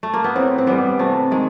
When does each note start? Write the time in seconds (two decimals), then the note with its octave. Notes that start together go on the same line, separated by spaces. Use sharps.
0.03 A3
0.14 A#3
0.24 B3
0.35 A2 C4
0.58 C4
0.67 E3 G3 B3
0.99 C3 A3
1.31 D#3 G#3